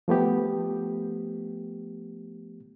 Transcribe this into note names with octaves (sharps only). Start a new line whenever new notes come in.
F3 A3 B3 G4